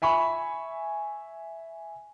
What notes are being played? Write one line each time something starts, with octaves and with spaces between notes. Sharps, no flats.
E5 G#5 B5 C#6